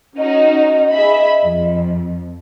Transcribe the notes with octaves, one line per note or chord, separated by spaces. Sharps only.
C#4 D#4 F#4 D#5
G#4 E5 B5
F2